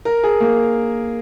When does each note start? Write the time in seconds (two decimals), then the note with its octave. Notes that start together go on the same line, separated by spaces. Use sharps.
0.05 A#4
0.23 G#4
0.40 A#3